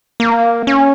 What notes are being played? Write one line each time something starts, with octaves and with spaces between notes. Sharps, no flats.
A#3
C#4